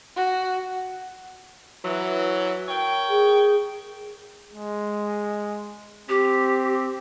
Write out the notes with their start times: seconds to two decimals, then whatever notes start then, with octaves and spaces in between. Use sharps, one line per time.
0.16 F#4
1.85 E3 F#3
2.69 A#4 C#5 G5
3.10 G#4
4.53 G#3
6.09 C4 G4